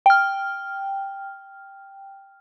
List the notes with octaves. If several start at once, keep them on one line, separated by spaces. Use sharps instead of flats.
G5 F6